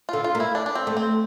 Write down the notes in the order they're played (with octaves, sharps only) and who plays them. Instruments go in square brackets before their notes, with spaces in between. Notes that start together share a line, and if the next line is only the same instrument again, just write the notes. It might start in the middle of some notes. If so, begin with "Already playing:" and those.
[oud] D3 [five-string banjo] F4
[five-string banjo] F4
[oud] A#3
[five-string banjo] E4
D4
D4
C4
[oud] A3
[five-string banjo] C4